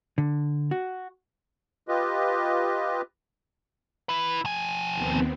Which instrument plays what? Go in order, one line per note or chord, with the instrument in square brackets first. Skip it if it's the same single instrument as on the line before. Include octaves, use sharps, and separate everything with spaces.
[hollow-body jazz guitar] D3
F#4
[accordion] F4 G4 B4 D#5
[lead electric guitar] E4 B4
F3 G#5
[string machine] D#2 B3 C4